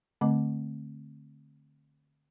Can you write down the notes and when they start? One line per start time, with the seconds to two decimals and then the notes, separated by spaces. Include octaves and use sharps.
0.21 D3 A3 C4 D#5 D6